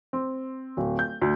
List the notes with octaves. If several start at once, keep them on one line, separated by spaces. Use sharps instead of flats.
C4
D1
G6
D2